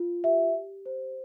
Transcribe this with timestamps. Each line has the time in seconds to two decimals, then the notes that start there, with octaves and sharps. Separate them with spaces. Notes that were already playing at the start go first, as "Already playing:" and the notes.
Already playing: F4
0.23 G4 E5
0.54 G4
0.86 C5